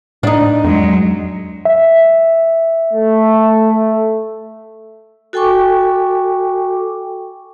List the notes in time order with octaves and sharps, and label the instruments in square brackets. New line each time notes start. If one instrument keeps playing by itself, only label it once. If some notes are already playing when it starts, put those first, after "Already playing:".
[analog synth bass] A2 [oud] D4 D#4
[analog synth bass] F2 [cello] F#3 G#3
[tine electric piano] E5
[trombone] A3
[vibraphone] F#4 A4 G5 G#5 C#6 D6